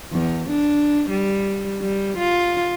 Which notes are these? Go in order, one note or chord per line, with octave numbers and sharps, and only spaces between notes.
E2
D4
G3
G3
F4